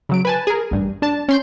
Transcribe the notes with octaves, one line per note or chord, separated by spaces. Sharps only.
C#3 F#3 D7
B4 G#5 A5
G#4 A#4
A1 G2
D4 A5
C#4 C6 G6